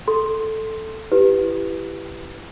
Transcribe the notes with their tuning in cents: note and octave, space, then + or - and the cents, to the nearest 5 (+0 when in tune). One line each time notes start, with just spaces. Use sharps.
A4 +0 C6 +0
E4 +25 G4 +0 B4 +0